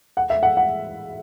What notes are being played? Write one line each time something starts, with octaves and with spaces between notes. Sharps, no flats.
F#5
E5
F#5
F#5